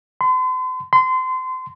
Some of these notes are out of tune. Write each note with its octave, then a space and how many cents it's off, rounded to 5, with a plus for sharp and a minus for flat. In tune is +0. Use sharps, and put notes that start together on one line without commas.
C6 -45
C6 -30